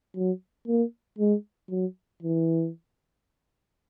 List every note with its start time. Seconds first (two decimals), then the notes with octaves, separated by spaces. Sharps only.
0.16 F#3
0.68 A#3
1.19 G#3
1.70 F#3
2.23 E3